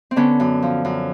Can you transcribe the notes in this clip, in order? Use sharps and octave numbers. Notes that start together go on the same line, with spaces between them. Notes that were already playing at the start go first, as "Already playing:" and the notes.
C4
D3 B3 C#4
F#2
F3
F#2